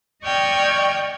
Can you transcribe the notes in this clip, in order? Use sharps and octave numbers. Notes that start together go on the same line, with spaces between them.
D5 D#5 G5 C#6 F6 G#6